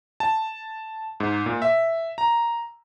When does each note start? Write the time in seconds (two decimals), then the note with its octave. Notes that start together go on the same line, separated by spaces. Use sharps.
0.20 A5
1.20 G#2
1.46 A#2
1.62 E5
2.18 A#5